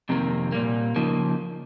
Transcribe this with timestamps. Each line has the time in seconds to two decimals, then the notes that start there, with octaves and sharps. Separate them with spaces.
0.09 F2 C3 D#3 A#3
0.52 A#2 G3 A#3
0.96 C#3 F3 A#3 D#4